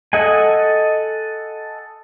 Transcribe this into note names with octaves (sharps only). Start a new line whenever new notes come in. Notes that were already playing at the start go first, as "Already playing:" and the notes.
A4 D#5 F#5 G#5